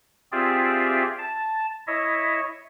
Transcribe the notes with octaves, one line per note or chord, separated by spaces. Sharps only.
C4 F4 G4 G#4 D5 E5
A5
E4 C#5 D#5 E5